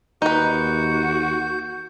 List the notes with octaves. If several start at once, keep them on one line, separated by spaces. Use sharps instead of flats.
D#2 D#4 F#4 B4 G6